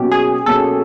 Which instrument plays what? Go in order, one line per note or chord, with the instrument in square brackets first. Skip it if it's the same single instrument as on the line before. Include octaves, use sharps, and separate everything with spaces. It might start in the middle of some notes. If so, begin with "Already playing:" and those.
Already playing: [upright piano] B2 F#3 A#3 C#4 [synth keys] G4
[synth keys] G#4
[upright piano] B2 F#3 A#3 C#4 [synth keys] A4